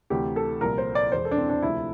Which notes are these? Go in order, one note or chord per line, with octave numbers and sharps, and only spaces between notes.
D2 C3 E3 G4
A4
C2 A#2 F3 A#4
C5
D5
E1 E2 E3 C5
A4
D4
C4
D4
D2 C3 F3 E4